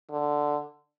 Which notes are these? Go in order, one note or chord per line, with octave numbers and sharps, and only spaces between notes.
D3